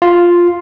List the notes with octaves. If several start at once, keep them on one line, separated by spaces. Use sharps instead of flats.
F4